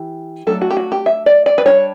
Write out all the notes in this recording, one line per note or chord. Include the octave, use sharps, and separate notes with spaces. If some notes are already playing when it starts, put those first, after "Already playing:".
Already playing: E3 G4
F#3 A3 D4 A4
F#4
G4
F#4
G4
E5
D5
D5
B4
G3 D4 C#5